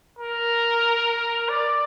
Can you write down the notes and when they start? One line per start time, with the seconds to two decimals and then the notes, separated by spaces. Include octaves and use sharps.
0.19 A#4
1.49 D5